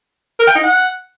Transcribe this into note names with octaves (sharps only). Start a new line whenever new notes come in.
A#4
G5
D#4
F#5